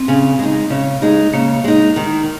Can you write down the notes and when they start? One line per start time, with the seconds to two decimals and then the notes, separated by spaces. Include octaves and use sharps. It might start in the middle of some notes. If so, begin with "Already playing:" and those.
Already playing: C4
0.08 C#3
0.39 G#3 D#4
0.70 C#3
1.02 G#3 D#4
1.33 C#3 A#3
1.64 G#3 D#4
1.96 D#3 D#4